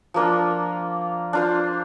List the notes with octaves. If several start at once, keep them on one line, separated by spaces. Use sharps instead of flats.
F3 A#3 D4 F4
D4 F4 C5